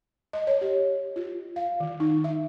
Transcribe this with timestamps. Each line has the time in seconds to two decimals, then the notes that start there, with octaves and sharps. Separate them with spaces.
0.33 D#5
0.47 C#5
0.61 G4
1.16 F4
1.56 F5
1.80 D#3
2.00 D#4
2.24 E5